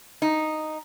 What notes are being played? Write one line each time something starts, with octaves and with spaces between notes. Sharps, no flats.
D#4